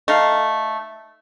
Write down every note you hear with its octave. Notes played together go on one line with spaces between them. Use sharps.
A3 D#4 F5